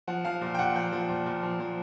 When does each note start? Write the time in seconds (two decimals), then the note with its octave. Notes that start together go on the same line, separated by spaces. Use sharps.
0.08 F3 F#5
0.25 F3 F5
0.41 A#2
0.54 G5
0.59 A#2 F#5
0.75 F3 G5
0.92 F3
1.09 A#2
1.26 A#2
1.43 F3
1.60 F3